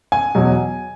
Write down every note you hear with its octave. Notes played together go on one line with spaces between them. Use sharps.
G#5
E2 B2 F#3